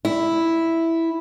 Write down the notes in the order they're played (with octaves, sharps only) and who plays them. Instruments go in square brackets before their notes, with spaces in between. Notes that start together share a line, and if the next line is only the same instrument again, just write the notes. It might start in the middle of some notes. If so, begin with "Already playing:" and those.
[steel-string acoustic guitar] E4